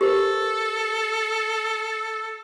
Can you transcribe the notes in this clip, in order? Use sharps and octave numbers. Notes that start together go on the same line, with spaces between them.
G4 A4 A#4 C5